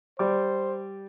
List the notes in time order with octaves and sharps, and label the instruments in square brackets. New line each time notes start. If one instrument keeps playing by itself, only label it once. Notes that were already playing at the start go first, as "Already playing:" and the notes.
[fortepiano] G3 D6 [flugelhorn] C5